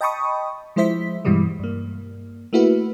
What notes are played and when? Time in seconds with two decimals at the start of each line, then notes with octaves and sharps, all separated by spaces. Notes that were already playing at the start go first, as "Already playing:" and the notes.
0.01 D#5 G5 A5 B5 C#6 D#6
0.76 F3 G#3 E4 C5 E5 B6
1.25 G2 B2 E3 G3 G#3
1.59 G2 A#3
2.53 A3 A#3 E4 F#4 B4